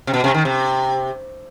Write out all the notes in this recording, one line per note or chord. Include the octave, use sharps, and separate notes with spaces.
C3
B2
C3
D#3
C3